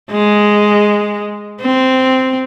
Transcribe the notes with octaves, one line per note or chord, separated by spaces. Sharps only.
G#3
C4